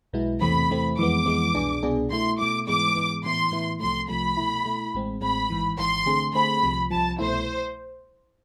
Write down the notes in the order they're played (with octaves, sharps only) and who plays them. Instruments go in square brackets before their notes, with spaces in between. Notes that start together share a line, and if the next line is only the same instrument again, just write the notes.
[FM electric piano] B1 B2 G#3 B3 E4
[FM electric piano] E2 C3 E3 A3 C4 [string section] B5
[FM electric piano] E2 C3 E3 A3 C4
[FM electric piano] F2 E3 G#3 B3 [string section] D6
[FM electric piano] F2 E3 G#3 B3
C2 B2 B3 D4 G#4
C2 B2 B3 D4 G#4
[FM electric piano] B2 A3 E4 [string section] C6
[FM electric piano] B2 A3 E4 [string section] D6
[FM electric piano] G#2 E3 G#3 B3 [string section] D6
[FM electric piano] G#2 E3 G#3 B3
[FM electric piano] A2 E3 B3 E4 [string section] C6
[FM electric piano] A2 E3 B3 E4
[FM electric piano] C2 C3 F3 A3 [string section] C6
[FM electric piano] C2 C3 F3 A3 [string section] B5
[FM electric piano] B2 A3 E4
B2 A3 E4
A1 A2 G#3 C4
[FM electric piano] A1 A2 G#3 C4 [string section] B5
[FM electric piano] G#1 G#2 E3
[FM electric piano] G#1 G#2 E3 [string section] C6
[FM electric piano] D3 A3 C4 G#4 C5
[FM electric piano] D3 A3 C4 G#4 C5 [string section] B5
[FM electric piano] C2 C3 F3
[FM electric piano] C2 C3 F3 [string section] A5
[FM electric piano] C2 B2 A3 E4 [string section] C5